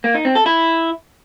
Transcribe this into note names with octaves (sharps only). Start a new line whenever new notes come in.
A#3
D#4
C4
A4
E4